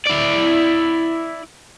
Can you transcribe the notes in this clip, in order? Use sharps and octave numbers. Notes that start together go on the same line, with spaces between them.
E4 D5